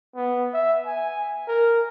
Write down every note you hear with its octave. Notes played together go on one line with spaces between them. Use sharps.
B3
E5
G#5
A#4